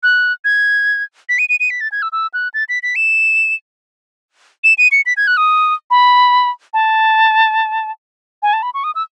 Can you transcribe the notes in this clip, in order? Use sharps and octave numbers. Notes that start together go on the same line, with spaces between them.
F#6
G#6
B6
D#7
D#7
D#7
B6
A6
G#6
E6
E6
F#6
A6
B6
B6
E7
E7
D#7
C#7
B6
G#6
F#6
D#6
B5
A5
G#5
A5
B5
C#6
D#6
E6